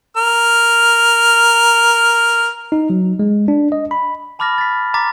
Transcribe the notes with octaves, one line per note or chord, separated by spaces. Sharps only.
A#4 F6
D#4
F#3
G#3
D4
D#5
B5
A5 B5 D6 F6 A6 A#6
A6 B6
A#5 D6 A6 B6